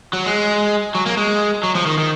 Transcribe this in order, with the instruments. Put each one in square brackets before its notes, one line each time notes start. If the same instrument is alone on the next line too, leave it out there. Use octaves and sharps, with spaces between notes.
[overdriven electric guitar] F#3
G#3
F#3
A#3
G#3
F#3
F3
D#3
D#3